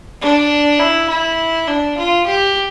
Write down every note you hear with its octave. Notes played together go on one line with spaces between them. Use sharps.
D4
E4
E4
D4
F4
G4